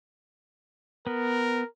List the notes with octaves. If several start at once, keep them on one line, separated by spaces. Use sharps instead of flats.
B3 A#4